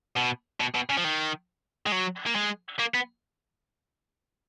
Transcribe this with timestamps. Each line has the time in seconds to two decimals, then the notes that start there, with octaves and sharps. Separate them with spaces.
0.16 B2
0.60 B2
0.75 B2
0.89 C#3
0.97 F3
1.04 D#3
1.86 G#3
1.92 F#3
2.27 A#3
2.36 G#3
2.79 A#3
2.94 B3